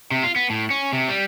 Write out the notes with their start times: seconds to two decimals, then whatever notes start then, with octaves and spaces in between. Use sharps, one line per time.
0.11 C3
0.23 F4
0.36 B3
0.50 A2
0.70 C#4
0.93 C3
1.08 G3